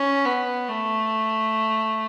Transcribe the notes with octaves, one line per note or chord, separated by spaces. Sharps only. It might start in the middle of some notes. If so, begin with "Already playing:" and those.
Already playing: C#4
B3
A3